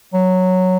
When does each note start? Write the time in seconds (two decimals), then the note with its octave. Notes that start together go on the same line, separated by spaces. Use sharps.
0.13 F#3